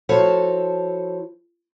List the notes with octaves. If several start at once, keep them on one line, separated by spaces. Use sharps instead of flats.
F3 E4 F#4 A4 C5 C#5